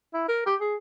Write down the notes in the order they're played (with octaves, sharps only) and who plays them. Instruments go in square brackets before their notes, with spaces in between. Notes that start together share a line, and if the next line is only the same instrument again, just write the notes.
[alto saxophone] E4
A#4
G4
G#4